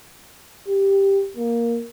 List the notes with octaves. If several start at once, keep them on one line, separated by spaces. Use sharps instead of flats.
G4
A#3